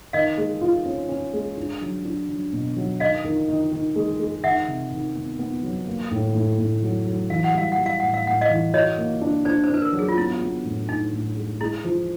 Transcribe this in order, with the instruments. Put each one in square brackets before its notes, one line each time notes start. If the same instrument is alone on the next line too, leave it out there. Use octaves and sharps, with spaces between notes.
[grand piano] D#3 [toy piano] D#5 F5
[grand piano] G#3
F4
C#4
C#4
G#3
D4
F#3
D4
F#3
B2
F#3
[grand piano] D#3 [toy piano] D#5 F5
[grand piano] D#3
D#3
D#3
G#3
G#3
[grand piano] D#3 [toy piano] E5 F#5
[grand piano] C3
D#3
B3
B3
F#3
A#3
A2
A2
A2
F#3
F#3
[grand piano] E3 [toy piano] F5
[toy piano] F#5
[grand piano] G3 [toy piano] F5
[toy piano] F#5
[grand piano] G3
[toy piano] F5
[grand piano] A2 [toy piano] F#5
[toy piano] F5
[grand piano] A2 [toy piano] F#5
[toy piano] D#5 F5
[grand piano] E3
[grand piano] F#4 [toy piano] C#5 D#5
[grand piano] A#3
D4
[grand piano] D4 [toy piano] C5 D5
[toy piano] C5
[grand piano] D4 [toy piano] B4
[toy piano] A#4
[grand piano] F#3
[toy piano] G#4
F4
[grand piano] B3 [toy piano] E4
[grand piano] B3
A2
[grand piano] A2 [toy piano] D#4
[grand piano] A2
G#3
[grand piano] G#3 [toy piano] E4
[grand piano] F3